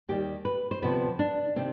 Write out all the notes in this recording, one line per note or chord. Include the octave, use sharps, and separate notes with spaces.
D#2 D#3 G3 G4
B4
C5
D2 C3 F3 B3 B4
D4
C3 D#3 C4